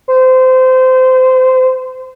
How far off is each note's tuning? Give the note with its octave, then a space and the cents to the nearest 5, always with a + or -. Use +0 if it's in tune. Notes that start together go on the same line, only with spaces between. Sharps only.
C5 -25